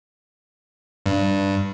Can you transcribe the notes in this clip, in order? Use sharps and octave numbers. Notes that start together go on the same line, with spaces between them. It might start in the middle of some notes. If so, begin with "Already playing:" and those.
G2